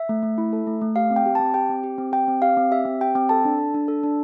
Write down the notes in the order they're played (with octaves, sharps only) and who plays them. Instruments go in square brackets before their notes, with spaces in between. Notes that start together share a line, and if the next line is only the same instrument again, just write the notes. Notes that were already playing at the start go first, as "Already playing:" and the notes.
Already playing: [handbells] E5
A3
A3
E4
A4
A3
A3
G4 F5
C4
G5
G4
C4 A5
G4 G5
C4
G4
C4
G4 G5
C4
G4 F5
C4
G4 E5
C4
G4 G5
C4 G5
A4 A5
D4
A4
D4
A4
D4